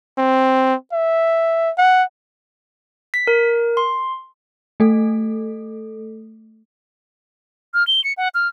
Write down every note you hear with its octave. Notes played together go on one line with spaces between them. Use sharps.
C4
E5
F#5
B6
A#4
C6
A3 A4
F6
G7
C#7
F#5
F6